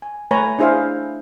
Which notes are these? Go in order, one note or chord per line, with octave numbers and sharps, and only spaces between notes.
G#5
A3 B4 C#5 G#5 A#5
D4 E4 G#4 C5 E5 F5